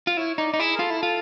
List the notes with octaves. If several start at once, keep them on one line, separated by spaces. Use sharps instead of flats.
F4
E4 C#5
D#4 D5
D#4
E4 G#4
A#4
F4 A4
E4
F4 A4